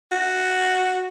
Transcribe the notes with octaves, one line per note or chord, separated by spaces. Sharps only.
F#4